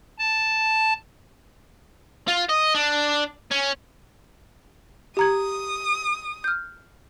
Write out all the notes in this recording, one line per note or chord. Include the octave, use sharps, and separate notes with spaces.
A5
F4
D#5
D4
C#4
G4 A#5 D#6 G#6
F6 G6